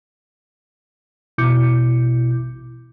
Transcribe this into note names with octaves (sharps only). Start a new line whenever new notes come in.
A1 B2 E4 D6 G6 C#7